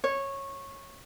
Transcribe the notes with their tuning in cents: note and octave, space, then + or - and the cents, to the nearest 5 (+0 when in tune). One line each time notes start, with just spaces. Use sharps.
C#5 -15